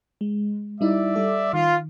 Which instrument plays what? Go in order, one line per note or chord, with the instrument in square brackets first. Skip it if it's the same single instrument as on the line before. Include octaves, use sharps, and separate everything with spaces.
[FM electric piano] G#3
[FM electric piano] G3 D#4 E4 [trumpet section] D5 E5
[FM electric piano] G3 A4 D6
[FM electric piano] D#3 [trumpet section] F4